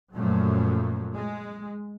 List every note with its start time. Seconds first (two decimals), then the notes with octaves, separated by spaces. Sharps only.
0.15 F#2 A#2 F3 F#3 A3
1.15 G#3